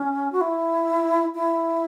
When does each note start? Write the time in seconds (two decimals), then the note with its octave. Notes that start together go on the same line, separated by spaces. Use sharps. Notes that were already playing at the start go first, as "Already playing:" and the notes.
Already playing: C#4
0.32 F#4
0.41 E4
1.35 E4